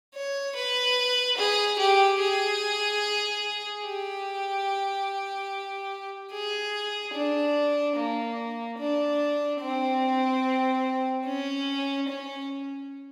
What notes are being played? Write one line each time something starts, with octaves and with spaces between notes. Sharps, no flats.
C#5
B4
G#4
G4
G#4
G4
G#4
D4
A#3
D4
C4
C#4
C#4